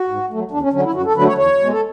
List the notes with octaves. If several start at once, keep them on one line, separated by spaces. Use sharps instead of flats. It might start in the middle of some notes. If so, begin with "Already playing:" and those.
Already playing: F#4
G#2
F#3 A3
E2 D4
C#4
D3 F#3 C#4
E4
F#2 F#4
A4
D3 F#3 A3 B4
C#5
E2 C#5
B2 G#3
A4